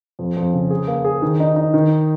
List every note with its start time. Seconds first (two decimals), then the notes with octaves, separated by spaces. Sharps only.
0.19 F2
0.37 F2
0.54 C#3
0.70 G#4
0.88 A#3
1.05 G#4
1.22 D#3
1.40 D#4
1.56 D#4
1.74 D#3